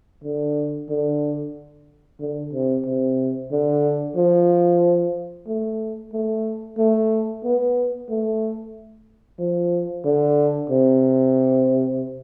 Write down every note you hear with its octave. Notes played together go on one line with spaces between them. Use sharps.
D3
D3
D3
C3
C3
D3
F3
A3
A3
A3
B3
A3
F3
D3
C3